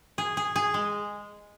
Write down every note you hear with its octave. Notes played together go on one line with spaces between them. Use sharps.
G#4
G#4
G#4
G#3